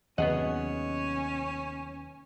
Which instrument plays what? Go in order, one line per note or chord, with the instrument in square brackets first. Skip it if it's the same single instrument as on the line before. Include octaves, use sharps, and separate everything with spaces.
[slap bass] D#2 C3 F#3 [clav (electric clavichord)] B3 G#4 F#5 [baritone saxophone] C#4 [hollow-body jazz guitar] D#5